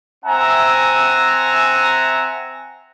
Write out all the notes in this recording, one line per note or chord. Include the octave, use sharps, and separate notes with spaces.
C4 E5 F#5 G#5 A#5